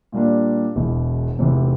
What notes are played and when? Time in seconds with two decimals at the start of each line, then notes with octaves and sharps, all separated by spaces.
0.12 A#2 G3 A#3 D4
0.76 E1 E2 B2
1.39 F1 E2 C3